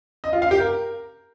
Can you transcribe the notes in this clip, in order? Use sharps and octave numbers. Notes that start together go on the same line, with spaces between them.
D#5
F4
F5
G4
A#4